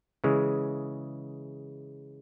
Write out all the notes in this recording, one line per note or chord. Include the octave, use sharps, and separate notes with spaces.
C#3 E3 G#3